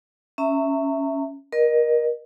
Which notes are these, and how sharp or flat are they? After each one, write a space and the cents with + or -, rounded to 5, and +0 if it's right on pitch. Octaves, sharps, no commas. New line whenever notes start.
C#4 +0 E5 +0 A#5 -35
A#4 +25 D#5 -25